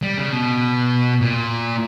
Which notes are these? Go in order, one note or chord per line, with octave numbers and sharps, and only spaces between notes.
G3
C#3
B2
A#2